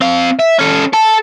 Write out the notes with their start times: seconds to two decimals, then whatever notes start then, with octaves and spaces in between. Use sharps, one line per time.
0.01 C4 F5
0.39 E5
0.59 C#4 A4
0.93 A4 A5